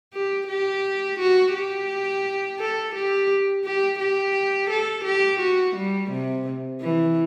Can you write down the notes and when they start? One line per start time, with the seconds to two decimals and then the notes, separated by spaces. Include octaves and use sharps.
0.13 G4
0.48 G4
1.19 F#4
1.54 G4
2.59 A4
2.95 G4
3.65 G4
4.00 G4
4.70 A4
5.05 G4
5.40 F#4
5.76 G3
6.11 C3
6.81 E3